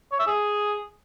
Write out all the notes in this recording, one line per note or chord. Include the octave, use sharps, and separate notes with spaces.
C#5
E5
G#4